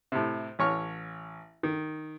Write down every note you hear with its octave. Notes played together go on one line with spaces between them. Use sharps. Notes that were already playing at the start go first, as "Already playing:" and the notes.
A2 C3
A1 C#5 C#6 F6
D#3